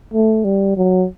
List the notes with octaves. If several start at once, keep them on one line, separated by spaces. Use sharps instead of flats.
A3
G3
F#3